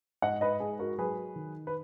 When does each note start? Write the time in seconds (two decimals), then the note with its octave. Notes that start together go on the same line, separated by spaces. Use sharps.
0.22 G#2 D#5 F#5
0.41 B4 D#5
0.60 G#2 G#4
0.79 F#4 A#4
0.98 F#3 G#4 B4
1.36 D#3
1.67 B4